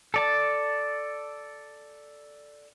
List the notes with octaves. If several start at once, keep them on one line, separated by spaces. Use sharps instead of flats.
A4 D5 A5